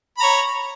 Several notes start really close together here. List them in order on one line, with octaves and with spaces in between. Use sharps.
B5 A#5 C#5